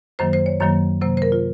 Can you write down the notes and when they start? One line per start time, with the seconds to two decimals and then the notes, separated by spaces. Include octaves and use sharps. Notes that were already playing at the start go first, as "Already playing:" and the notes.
0.19 F#2 D#3 F#3 A#3 C5
0.33 C5
0.46 C#5
0.60 F#2 D#3 F#3 A#3 C#5
1.02 C3 F#3 A#3 C5
1.17 C5
1.22 A#4
1.32 F4